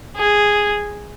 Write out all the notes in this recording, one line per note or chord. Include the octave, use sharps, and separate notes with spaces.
G#4